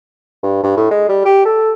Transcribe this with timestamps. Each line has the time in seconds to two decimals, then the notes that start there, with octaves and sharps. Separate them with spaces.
0.43 G2
0.63 G2
0.77 A2
0.90 G#3
1.09 G3
1.25 G4
1.45 A4